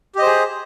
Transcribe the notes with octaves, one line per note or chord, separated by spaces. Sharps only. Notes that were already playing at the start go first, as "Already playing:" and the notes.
G4 G#4 C5 D#5